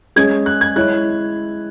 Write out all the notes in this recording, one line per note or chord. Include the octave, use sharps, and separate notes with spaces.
G#3 C#4 G#4 G#6
F#6
G#6
G#3 E4 C#5 F#6